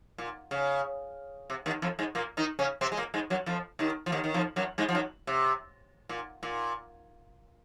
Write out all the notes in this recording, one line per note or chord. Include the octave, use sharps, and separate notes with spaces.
A#2
C#3
C3
D#2 D#3
F2 F3
G#2 G#3
A#2 A#3
D#3 D#4
C#3 C#4
C3 C4
G#3
A#2 A#3
G#2 G#3
F#2 F#3
F2 F3
D#2 D#3
F3
D#2 D#3
D#3
F2 F3
F#2 F#3
G#2 G#3
F3
F#2 F#3
C3
A#2
A#2